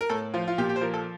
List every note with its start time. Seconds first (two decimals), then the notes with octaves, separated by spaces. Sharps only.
0.01 A#4
0.10 A2 A4
0.34 F3 F4
0.48 F4
0.58 A#2 G4
0.69 G4
0.76 C5
0.81 F3 A#4
0.94 A4